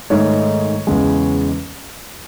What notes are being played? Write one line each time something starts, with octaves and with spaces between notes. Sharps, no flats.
G#2 D#3 A3 D#4 C#5
E2 C#3 G#3